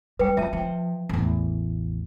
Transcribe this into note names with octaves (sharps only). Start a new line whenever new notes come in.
G3 B4 G5
F3 E5 A5
F3 G5
A1 E2